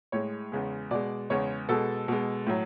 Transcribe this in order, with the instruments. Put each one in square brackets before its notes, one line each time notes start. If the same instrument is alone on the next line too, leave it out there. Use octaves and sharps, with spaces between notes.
[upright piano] A2 G#3 C#5
E2 C#3 G#3
B2 G#3 D5
E2 C#3 G#3 C#5
B2 G#3 A4
B2 G#3
A2 F#3